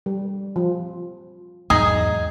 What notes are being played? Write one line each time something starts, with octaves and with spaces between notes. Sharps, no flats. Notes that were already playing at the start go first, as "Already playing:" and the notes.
G3
F3
E2 G#2 F#3 D#4 G#4